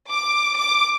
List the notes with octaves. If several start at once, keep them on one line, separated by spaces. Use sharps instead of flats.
D6
D6